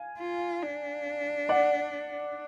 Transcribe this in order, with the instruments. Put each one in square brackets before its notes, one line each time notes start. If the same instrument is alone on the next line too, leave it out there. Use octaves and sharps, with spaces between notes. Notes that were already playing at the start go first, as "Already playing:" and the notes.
Already playing: [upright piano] F5 G#5
[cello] F4
D4
[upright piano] D5 F#5